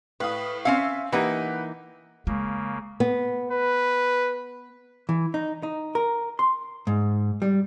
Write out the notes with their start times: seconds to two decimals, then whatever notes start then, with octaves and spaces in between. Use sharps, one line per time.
0.20 A2 B4 F5 D#6
0.65 C4 C#4 E5 F5 F6
1.12 E3 A#3 D#4 G4 B4 F#5
2.27 C#3 G#3 A#3
3.00 B3
3.51 B4
5.09 E3
5.34 D#4
5.63 D#4
5.95 A#4
6.39 C6
6.87 G#2
7.42 G3